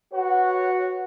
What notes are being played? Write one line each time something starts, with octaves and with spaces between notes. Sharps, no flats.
F#4 B4 C#5 F#5